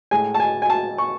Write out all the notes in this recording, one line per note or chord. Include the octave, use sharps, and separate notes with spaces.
A2 G#3 G#5
A5
G#5
G#5
A5
C#6